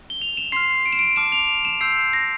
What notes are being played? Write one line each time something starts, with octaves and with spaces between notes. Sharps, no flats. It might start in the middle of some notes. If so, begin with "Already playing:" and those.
G7
F7
E7
C6 F6 C7
D7
E7
D7
A5 D6 F6 E7
F7
E7
C6 E6 G6 C7
A#6